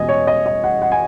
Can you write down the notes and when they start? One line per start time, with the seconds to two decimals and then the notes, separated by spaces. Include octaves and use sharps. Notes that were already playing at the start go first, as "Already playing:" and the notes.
Already playing: E2 B2 G#3 B3 D#5 G#5
0.09 C#5
0.27 D#5
0.46 D#5
0.64 F#5
0.82 F#5
0.92 G#5